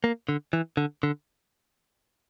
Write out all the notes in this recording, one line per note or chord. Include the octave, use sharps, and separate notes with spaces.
A#3
D3
E3
D3
D3